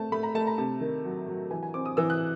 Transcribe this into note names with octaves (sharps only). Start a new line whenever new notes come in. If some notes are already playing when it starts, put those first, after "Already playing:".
Already playing: A3 C4 A5
A3 B5
A#5
A3 A5
A#5
C3 A5
D#3
F#3
F#3
E3 G#5
G#5
C4 D6
D#6
E3 E6
F#6